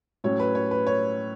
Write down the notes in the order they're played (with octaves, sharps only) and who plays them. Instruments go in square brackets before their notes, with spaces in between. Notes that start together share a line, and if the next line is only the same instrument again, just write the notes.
[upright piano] A2 F#3 C#4 C#5
B4
C#5
B4
C#5